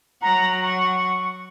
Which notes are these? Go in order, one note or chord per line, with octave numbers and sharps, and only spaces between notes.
F#3 F#5 A#5
C#6